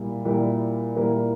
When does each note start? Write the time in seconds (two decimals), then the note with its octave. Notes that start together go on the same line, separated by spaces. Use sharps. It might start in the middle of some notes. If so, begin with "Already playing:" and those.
Already playing: A#2 G3 A#3 E4
0.25 A#2 G3 A#3 E4
0.96 A#2 G3 A#3 E4